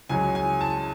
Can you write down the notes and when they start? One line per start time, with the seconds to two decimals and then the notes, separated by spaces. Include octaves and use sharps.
0.09 C#2 C#3 F#3 G#5
0.35 G#5
0.61 A5